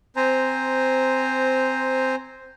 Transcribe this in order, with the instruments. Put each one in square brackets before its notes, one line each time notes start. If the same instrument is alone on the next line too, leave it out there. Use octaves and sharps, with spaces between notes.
[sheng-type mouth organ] C4 C5 G#5 A#5